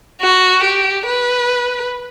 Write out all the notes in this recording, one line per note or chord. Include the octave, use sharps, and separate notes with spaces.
F#4
G4
B4